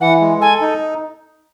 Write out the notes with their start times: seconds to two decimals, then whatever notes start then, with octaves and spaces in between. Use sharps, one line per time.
0.01 E3 F#5
0.21 G#3
0.41 A4 G#5
0.61 D#4